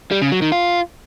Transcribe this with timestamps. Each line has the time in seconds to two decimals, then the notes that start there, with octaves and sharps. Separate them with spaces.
0.11 G3
0.22 C#3
0.32 F#3
0.42 D#3
0.52 F4